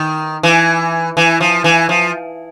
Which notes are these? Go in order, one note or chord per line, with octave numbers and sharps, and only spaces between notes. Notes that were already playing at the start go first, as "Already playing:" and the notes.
Already playing: D#3
E3
E3
F3
E3
F3